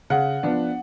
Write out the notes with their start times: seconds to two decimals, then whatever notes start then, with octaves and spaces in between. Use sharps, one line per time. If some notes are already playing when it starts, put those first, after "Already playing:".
0.10 C#3 F#5
0.43 F3 B3 D4